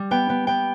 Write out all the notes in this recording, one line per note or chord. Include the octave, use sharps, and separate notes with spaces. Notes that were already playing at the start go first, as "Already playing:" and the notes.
Already playing: G3
B3 G5
B3
B3 G5